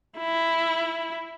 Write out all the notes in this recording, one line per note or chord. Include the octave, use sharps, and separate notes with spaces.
E4